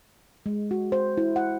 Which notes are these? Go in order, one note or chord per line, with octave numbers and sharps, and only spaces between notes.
G#3
F#4
C5
E4
F#5